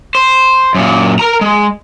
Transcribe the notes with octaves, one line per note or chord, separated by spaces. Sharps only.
C5
F#2 A#2
A#4 A#5
G#3